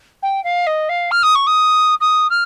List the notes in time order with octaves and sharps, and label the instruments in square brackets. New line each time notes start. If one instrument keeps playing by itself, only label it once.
[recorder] G5
F5
D#5
F5
F6
D#6
C#6
D#6
D#6
F6